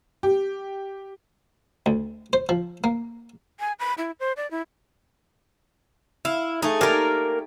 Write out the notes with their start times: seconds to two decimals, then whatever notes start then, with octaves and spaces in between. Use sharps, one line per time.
0.23 G4
1.86 D2
2.33 C5
2.49 F3
2.84 A#3
3.60 G#5
3.79 B5
3.98 E4
4.20 C5
4.37 D5
4.51 E4
6.25 E4 F5
6.62 A3 D#4 G#4
6.81 A#3 G4 A#4 D5 G#5